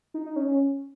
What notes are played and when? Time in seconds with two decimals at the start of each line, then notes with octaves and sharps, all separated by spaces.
0.14 D#4
0.26 D#4
0.36 C#4
0.47 C#4